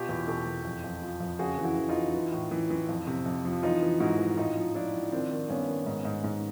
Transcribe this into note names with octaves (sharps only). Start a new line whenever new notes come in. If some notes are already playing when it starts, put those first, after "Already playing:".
Already playing: B2 F4 G4
E2
B2 G4 A4
E2
F2
F2
F3
F2
C#3 F#4 G#4
E3
E4 F#4
E3
D#4 F4
E3
E3
A2
E3
E3
F2
C3
F2
F3
E3 D#4 F4
E3
G#2 E4 F#4
E3
A2 D#4 F4
F3
F3 D4 E4
F3
D#3 C4 D4
D#3
G2 B3 C#4
D#3
G#2
G#2
G#2